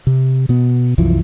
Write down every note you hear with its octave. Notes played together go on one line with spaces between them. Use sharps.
C3
B2 B3
C2 F#2 E3 F3